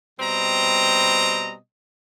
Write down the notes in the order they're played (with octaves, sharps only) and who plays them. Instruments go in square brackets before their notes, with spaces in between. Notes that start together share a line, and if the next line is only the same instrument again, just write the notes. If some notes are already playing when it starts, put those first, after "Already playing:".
[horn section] B2 G3 C4 D#5 A#5